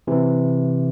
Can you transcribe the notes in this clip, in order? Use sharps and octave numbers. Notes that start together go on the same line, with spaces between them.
C3 E3